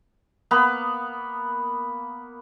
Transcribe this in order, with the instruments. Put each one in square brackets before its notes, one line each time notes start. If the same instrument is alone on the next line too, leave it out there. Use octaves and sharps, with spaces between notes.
[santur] A#3 B3 B4